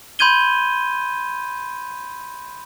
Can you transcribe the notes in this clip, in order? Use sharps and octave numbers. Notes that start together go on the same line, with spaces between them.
B5 C6 G6 G#6 D#7 G7